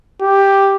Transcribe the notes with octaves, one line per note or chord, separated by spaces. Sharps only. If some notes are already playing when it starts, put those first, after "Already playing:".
G4